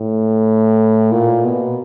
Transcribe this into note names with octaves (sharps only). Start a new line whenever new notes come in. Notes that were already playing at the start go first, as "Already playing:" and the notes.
Already playing: A2
A#2
B2